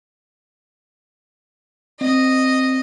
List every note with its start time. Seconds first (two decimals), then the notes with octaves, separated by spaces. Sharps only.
2.01 C4 D#5